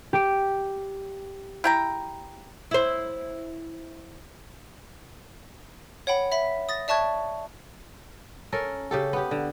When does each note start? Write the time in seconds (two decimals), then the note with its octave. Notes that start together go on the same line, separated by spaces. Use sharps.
0.13 G4 D7
1.64 E4 G5 A#5
2.71 E4 C5
6.07 C#5 F#5 G5 B5
6.32 E5 B5 B6
6.69 D#6 A6 A#6
6.88 D5 E5 A5 C#6 F#6 G#6
8.52 C#4 A4 A#4
8.91 C#3 G4 A4
9.13 B3 G4
9.31 D3